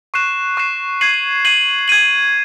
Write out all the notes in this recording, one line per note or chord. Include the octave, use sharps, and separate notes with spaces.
C#6 F#6 C7 E7
C#6 F#6 C7 E7
G#6 C7 D#7 F#7
G#6 C7 D#7 F#7
G#6 D#7 F#7